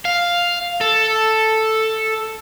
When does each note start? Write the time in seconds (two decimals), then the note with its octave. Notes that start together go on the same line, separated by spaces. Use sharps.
0.05 F5
0.81 A4